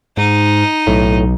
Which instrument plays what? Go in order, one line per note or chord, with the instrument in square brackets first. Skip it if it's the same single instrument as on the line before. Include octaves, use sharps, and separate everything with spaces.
[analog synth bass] G#2 [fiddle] D#4
[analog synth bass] B1 [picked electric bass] A2